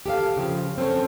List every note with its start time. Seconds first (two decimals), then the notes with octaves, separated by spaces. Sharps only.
0.06 G4 A4 E5 F5
0.37 C#3 F3
0.78 C4 C#4 A4 C5 C#5